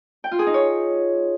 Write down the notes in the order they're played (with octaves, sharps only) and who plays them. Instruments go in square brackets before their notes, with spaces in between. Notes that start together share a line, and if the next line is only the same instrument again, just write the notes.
[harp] G5
F4
G#4
D#4
C#5